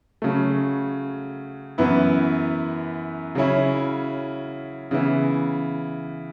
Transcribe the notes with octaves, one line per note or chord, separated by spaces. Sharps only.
C#3 F#3 A3
F#2 E3 B3 E4
C#3 F#3 C#4 E4
C#3 E3 B3 E4